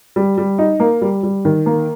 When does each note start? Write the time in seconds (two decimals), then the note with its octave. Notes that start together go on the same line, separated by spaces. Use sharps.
0.16 G3
0.38 G3
0.59 D#4
0.80 A#3
1.02 G3
1.23 G3
1.45 D#3
1.66 A#3